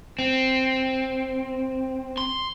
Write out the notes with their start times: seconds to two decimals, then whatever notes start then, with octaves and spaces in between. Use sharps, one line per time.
0.19 C4
2.18 C6